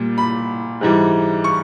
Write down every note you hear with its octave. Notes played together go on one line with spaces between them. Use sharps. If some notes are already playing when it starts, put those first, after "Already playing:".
Already playing: A#2 G3
B5
G#2 E3 G3
C#6